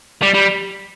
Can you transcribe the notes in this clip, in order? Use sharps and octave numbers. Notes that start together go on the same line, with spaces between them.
G3
G3